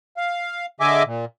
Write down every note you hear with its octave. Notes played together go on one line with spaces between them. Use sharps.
F5
D3 G#4 D#5 E5 G#5 D6
A#2